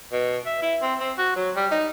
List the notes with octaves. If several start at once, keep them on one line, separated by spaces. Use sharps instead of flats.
B2
E5
E4
C4
C4
F#4
F#3
G3
D#4